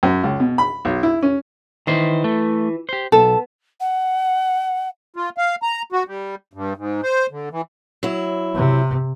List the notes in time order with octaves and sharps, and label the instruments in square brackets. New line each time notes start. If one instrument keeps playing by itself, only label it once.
[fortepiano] F#2
C#2
B2
B5
B1
E4
C#4
[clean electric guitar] D#3 C5 [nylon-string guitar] E3 E4
[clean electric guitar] A3
G4 C5
[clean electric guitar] B1 [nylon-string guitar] B3 A5 [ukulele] A4
[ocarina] F#5
[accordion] F4
F5
A#5
F#4
G3
G2
G#2
C5
D3
E3
[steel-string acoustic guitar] F#3 E4
[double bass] C3